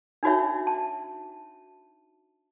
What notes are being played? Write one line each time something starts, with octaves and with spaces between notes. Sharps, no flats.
D4 D#4 F#4 C#5 E5
A5